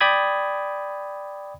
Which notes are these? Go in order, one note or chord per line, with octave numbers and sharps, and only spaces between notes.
D5 G5 B5 D#6 G#6